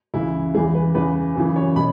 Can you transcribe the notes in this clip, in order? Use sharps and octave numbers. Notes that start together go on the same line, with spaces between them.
C#2 C#3 E3 E4
E2 C#3 E3 G#4
B4
E2 C#3 E3 B4
F#2 C#3 E3
C#5
B2 B5